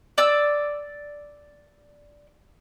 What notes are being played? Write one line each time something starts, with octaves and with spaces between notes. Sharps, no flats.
D5 E6